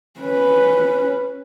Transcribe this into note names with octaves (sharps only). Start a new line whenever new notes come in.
C#4 B4